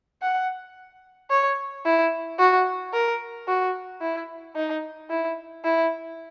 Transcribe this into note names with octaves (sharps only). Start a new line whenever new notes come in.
F#5
C#5
E4
F#4
A#4
F#4
E4
D#4
E4
E4